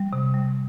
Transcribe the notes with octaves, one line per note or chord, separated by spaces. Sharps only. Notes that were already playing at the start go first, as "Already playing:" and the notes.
Already playing: G3
C3
G3